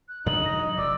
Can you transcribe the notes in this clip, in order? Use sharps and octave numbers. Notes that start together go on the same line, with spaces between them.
F#6
F#2 C#3 D4 D#4 F#7
E3 A#6
F#3 D#5
F1 E2 D5 E6